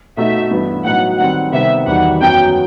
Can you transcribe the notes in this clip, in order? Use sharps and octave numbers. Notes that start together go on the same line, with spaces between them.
B2 A3 D#4 F#4 E5
G2 E3 B3 E4
A2 F#3 B3 D#4 F#5
D#3 G3 C4 F#5
C3 D#3 G3 B3 E5
E2 D#3 G3 D#4 F#4 F#5
F#2 F#3 B3 G5